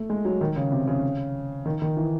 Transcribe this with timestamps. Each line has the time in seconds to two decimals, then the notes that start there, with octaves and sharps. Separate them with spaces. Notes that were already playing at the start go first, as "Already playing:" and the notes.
Already playing: A3
0.10 G#3
0.25 F#3
0.41 D#3
0.56 C#3
0.72 C3
0.87 C#3
1.66 D#3
1.82 D#3
1.97 E3